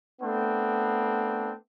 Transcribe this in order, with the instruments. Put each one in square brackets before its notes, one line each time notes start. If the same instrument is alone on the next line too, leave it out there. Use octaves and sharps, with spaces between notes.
[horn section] A3 B3 C4 D4